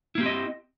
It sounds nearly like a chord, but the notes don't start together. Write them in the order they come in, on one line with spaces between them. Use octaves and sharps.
E4 A#3 G4 C4 D#5